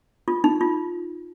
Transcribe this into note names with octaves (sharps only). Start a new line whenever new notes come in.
F4
D#4
F4